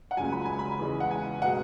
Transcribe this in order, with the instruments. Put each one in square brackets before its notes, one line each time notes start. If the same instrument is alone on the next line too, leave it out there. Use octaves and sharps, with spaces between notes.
[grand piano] F#5
C#2 C#3 F#3 G#5
B5
G#5
B5
E2 C#3 G#3
F#5
G#5
B2 G#3 F#5